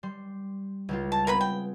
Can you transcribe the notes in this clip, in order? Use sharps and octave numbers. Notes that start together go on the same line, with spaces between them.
G3 C6
C#2 G3 F4
A5
B3 C4 G#4 A#4 B4 B5
G5